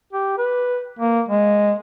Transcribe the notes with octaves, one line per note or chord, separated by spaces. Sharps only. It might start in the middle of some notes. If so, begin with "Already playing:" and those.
G4
B4
A#3
G#3